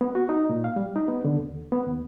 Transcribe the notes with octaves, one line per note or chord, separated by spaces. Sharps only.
B3
F#4
D#4
A#2
F5
G3
D#4
B3
D3
D#2
B3
D#2